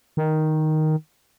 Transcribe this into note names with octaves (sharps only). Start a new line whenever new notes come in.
D#3